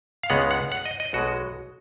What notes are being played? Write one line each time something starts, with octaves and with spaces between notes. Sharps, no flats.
F5
C#2 C#3 G#3 B3 F#5
F#5
F#5
D#5
D#5
B1 B2 G#3 F#4